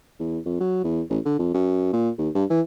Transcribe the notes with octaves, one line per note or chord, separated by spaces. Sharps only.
E2
F2
F#3
E2
A1
D3
F2
F#2
A#2
D#2
G2
E3